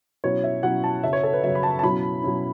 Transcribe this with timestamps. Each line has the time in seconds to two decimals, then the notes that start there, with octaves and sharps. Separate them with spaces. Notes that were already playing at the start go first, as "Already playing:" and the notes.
0.24 B2 F#3 C#4 E4 C#5
0.44 E5
0.63 B2 F#3 C#4 E4 F#5
0.84 A5
1.03 F#2 C#3 F#3 E5
1.13 C#5
1.23 A4
1.33 B4
1.43 F#2 C#3 F#3 E5
1.55 B5
1.63 A5
1.79 A5
1.83 B2 F#3 C#4 E4 B5
2.23 B2 F#3 C#4 E4